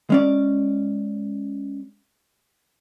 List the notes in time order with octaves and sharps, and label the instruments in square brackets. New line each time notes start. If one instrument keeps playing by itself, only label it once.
[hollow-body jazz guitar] G#3 C#4 D5